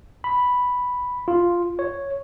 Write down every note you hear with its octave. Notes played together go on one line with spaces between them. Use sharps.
B5
F4
C#5